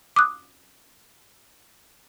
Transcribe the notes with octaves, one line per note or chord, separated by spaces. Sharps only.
D6 D#6 F#6